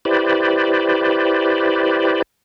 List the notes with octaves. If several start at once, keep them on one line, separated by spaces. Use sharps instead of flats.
E4 G4 B4 C5 D5